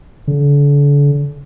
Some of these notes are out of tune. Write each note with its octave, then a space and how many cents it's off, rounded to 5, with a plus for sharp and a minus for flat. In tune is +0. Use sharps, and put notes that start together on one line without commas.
D3 -40